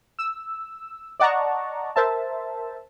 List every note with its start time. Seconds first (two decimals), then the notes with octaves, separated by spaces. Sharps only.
0.19 E6
1.20 D5 D#5 F#5 A5 A#5 C#6
1.96 A#4 C5 E5 A5